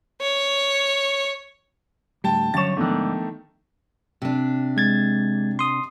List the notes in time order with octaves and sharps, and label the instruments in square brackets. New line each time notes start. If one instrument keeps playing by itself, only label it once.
[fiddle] C#5
[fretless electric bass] D2 A2 G3 [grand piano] G5 A5
[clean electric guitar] G2 C#5 [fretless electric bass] D3 F#3 C#4 [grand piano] A6 E7
[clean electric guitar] G#2 D3 [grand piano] D#3 A3 [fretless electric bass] F3 B3 D4
[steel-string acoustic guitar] C3 D4
[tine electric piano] G#3 G#6 A6
C6 D#6